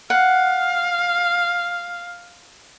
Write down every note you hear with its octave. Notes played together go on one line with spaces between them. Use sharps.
F5 F#5